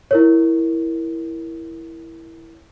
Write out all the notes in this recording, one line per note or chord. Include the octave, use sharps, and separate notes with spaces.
E4 A#4 C#5